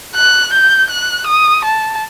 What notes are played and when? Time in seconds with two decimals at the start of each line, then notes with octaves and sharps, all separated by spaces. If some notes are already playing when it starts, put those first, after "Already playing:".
0.16 F#6
0.53 G6
0.90 F#6
1.27 D#6
1.65 A5